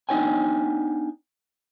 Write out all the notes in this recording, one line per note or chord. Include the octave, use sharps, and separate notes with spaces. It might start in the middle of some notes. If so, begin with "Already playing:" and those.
B3 D4 D#4 C#5 G5 G#5